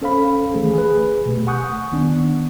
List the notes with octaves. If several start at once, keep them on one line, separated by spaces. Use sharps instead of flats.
C#4 A4 C5 F5 B5
D#3 E3 A3 G#4
G#4 B4
B2 A3 G4
F#5 G#5 C#6 D#6 F#6 G6
D#3 B3 D4